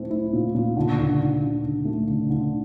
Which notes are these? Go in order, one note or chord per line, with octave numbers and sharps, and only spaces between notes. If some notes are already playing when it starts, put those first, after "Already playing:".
Already playing: A#2 A3 C4 E4
E4
A#2
A#2
D3
D3
D3
D4
D3
A3
D3
D3